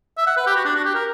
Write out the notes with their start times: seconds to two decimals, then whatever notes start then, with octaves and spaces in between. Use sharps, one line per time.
0.17 E5
0.27 F#5
0.37 B4
0.47 G4
0.56 F#4
0.65 D4
0.75 F#4
0.85 G4
0.95 A#4